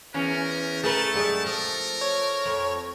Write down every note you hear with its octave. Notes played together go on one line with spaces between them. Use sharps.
E2 C#4 A#4
A3 G#4 A#4 B4 A5
F#2 G3 G#3
F3 A#4
C#5
F2